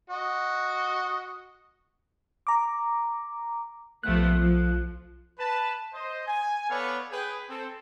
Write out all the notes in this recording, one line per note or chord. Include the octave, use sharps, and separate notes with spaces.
F#4 D#5
A#5 D6
B1 F3 A3 B3 F#6
F3
B4 A5
C5 D#5
G#5
B3 A4 B4 C#5 D5 F5
G#4 B4 G5
C4 A4